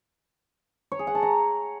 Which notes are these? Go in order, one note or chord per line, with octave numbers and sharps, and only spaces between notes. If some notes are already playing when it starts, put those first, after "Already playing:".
C#5
G#4
F#5
A5
A#5